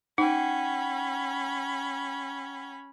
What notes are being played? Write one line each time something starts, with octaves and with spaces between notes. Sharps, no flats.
C#4 D#4 F#5 G5 B5